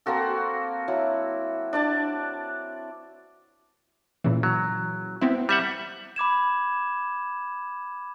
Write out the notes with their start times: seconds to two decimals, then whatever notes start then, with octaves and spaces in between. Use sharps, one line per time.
0.06 A#3 C4 F#4 A4
0.88 F#3 E4
1.73 D4 D5 A5
4.24 A#2 C#3 E3
4.43 F#3
5.21 B3 C4 E4
5.49 G3 E5 F#5 F#6
6.16 B5 D6 G#6 E7